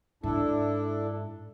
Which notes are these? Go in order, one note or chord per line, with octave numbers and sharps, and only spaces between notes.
G#2 D4 E4 A4